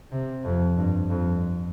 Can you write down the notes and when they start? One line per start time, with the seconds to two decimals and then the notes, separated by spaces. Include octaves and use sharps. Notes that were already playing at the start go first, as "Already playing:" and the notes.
0.12 C3
0.45 F2
0.77 G2
1.10 F2